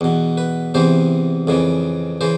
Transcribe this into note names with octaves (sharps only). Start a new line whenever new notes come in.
E2 B2
B4
E2 C3 E3 C5
F2 C#3 E3
C#3 E3 C5